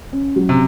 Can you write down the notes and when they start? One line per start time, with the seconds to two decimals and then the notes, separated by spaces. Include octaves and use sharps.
0.13 C#4
0.36 F#3
0.49 C3